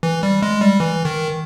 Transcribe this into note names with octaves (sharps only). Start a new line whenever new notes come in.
E3
G3
G#3
G3
E3
D#3